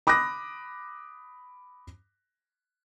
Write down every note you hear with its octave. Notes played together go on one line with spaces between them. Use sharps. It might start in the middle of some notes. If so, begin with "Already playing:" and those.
B5 D6 D#6 F#6 A#6